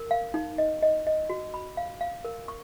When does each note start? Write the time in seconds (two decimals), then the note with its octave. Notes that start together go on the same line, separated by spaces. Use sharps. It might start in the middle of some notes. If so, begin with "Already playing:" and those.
Already playing: A#4
0.11 F5
0.34 D#4
0.58 D#5
0.82 D#5
1.07 D#5
1.30 F#4
1.54 B5
1.77 F5
2.01 F5
2.25 A#4
2.48 C#6